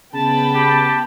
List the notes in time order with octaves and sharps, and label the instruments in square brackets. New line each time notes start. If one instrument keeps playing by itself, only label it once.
[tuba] C#3 [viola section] B3 G5 B5 [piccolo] A5
[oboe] G4